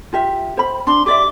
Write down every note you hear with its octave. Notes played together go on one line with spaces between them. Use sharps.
F4 G4 E5
C5 B5
D4 C6
G4 D5 E5 D6